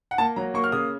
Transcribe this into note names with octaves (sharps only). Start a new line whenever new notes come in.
F#5
A#3 A5
F#3 A#5
A#3 C#6
F6
C#3 D#6